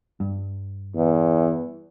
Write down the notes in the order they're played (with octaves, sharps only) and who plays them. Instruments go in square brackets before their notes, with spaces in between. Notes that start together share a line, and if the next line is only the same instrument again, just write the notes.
[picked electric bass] G2
[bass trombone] E2